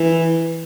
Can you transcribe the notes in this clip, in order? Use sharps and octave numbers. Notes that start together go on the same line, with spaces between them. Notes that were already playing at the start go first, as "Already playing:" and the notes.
Already playing: E3